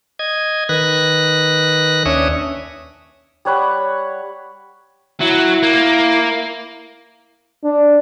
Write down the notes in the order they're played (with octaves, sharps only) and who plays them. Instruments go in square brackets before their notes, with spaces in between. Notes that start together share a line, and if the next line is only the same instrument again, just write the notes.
[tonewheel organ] D#5 G#6
D#3 B4 F#6 A#6
D#2 C#4 D4 C#5 E5 D#6
[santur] G3 C#5 F#5 B5
[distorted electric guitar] F#3 [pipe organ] E4
[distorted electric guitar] A#3
[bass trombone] D4